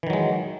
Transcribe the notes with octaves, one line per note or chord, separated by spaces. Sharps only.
D#3 E3 F#3 G#3